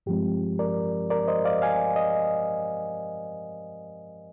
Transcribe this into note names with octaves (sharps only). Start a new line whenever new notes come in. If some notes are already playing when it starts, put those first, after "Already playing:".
G2 F3 G#3 C4 G4
A#4 D5
A#4 D5
C5 D#5
D5 F5
F5 G#5
D#5